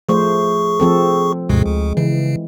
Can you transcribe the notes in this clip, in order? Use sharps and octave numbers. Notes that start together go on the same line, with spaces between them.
F3 A3 G#4 C5 C#6
F3 C4 A4
D2 G2 B2 G#3
D2
C#3 E3